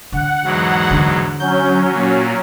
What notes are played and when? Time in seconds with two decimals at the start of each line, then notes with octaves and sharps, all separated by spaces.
0.12 D3 F#5
0.44 E2 G#2 F#3
0.91 D3
1.39 F#3 C#4 G6
1.94 A#2